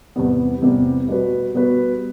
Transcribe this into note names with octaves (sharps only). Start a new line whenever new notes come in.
E2 C3 G3 B3
E2 C3 G3 B3
B2 G3 B3 F#4 B4
B2 G3 B3 F#4 B4